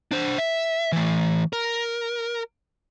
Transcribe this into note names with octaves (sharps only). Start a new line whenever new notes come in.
D4 C5
E5
E3 A3
A#4